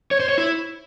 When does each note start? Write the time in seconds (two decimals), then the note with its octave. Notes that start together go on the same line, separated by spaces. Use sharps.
0.11 C#5
0.20 C5
0.29 C#5
0.38 E4